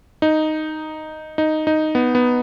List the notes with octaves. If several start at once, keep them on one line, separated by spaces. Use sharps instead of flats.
D#4
D#4
D#4
B3
B3